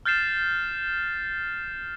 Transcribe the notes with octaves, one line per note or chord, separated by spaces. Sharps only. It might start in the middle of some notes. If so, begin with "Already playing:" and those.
F6 G6 A6 C7 E7